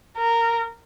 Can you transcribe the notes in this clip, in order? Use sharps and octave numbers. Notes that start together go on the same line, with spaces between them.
A#4